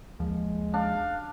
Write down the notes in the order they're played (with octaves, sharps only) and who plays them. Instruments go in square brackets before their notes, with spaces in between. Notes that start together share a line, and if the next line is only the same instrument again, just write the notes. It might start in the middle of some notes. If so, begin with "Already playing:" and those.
[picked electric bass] D#2 F3 [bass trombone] G#3
[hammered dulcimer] D4 [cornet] F5